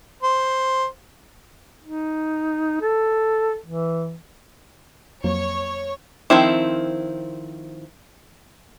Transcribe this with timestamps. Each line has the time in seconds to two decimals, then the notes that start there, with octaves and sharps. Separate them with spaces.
0.23 C5
1.84 D#4
2.82 A4
3.66 E3
5.24 F2 F#3 A#3 C#5
6.30 D#3 F3 C4 E4